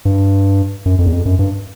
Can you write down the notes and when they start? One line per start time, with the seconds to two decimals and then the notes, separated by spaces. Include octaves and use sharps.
0.05 G2
0.86 F#2
0.98 F2
1.06 E2
1.12 F2
1.25 F#2
1.39 G2